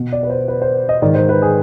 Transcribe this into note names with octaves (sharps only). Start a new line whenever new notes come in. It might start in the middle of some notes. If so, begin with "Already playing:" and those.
Already playing: B2
D5
B4
C5
B4
C5
D#5
G#2 D#3 D5
C5
B4
G#4